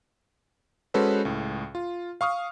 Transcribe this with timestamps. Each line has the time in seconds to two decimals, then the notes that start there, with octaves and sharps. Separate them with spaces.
0.94 G#3 C#4 F#4 A4 B4 C5
1.25 C#2 A2
1.75 F4
2.21 F5 C#6 D#6 F6